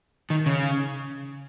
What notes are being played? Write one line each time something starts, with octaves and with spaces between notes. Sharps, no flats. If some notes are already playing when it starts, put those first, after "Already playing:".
D#3
C#3